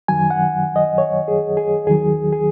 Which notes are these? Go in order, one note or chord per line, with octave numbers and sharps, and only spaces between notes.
F#2 D#3 F#3 G#5
F#5
D#5
C#5
G#4
G#4
D#2 D#3 F#3 G#4
G#4